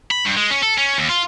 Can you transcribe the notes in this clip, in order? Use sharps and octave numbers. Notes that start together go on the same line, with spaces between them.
B5
G2
G#3
C#4
A4
C#4
D#2
F4